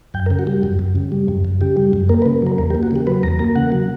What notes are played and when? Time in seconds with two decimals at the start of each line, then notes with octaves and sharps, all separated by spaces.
0.14 F#2 G5
0.26 A#4
0.30 C#3
0.39 F#4
0.47 G3
0.63 F#2
0.79 F#2
0.95 C#3
1.12 G3
1.28 F#2
1.45 F#2
1.61 C#3 G4
1.77 G3
1.93 F#2
2.09 A#3 A#4
2.22 B4
2.26 C#3
2.42 F#3 A#4
2.58 E2 A#4
2.70 G4
2.75 A#3
2.83 F#4
2.91 C#3 G4
3.07 F#3 B4
3.23 E2 A#5
3.39 A#3 A#5
3.55 C#3 F#5
3.72 F#3